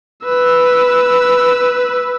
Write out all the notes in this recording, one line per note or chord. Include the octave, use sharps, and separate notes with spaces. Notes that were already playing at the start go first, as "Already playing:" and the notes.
B4 E6